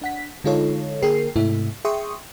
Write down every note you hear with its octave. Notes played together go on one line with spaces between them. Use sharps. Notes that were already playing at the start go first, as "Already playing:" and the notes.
D4 F#5 B6
D3 G#3 D#4 F4 A4 C#5
D3 A#3 G#4 A#4 G5 C7
G#2 C3 A3 E4
G#4 E5 G5 C6 C#6 D#6